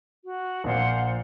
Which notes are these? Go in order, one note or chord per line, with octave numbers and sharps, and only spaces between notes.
F#4
A#1 A#2 C5 F5 F#5